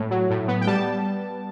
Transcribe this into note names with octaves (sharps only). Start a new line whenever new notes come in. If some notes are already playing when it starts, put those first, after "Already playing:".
Already playing: A2
F#3
A2
B3
G5
G3 A5